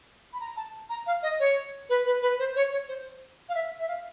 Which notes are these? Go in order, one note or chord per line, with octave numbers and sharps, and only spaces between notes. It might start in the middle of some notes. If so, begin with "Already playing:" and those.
B5
A#5
A5
A#5
F5
D#5
C#5
B4
B4
B4
C5
C#5
C#5
C5
F5
E5
E5
F5